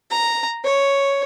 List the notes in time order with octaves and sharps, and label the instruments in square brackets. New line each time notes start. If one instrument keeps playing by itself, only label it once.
[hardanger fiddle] A#5
C#5